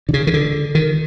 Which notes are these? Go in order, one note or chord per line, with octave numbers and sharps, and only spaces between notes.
D3
C#3
D#3
D3
D#3